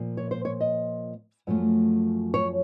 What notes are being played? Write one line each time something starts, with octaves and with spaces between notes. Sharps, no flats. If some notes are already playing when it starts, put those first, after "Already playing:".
Already playing: A#2 F3 A#3
C#5
C5
C#5
D#5
F#2 F3 A3
C#5